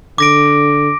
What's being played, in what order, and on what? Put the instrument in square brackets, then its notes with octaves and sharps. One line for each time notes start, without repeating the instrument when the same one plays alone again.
[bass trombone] D3 [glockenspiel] D6 A#6 D7